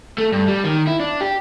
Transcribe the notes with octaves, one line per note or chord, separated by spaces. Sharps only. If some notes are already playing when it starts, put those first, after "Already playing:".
A3
G2
G3
D#3
E4
D4
G4